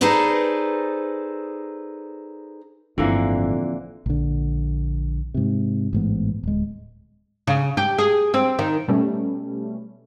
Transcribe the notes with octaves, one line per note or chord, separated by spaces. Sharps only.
D#4 G#4 A4 B4 C5 D5
G1 F2 A2 D3 E3 A#3
A#1 D3
G#2 C3
A1 G#2 B3
D1 G#3
C#3
G4
G#4
C4
D#3
B2 G3 A3 C#4